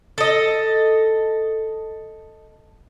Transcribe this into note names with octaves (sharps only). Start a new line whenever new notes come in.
A4 D#5